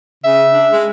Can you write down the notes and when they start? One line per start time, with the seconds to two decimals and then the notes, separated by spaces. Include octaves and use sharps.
0.24 C#3 E5
0.52 D4
0.71 G#3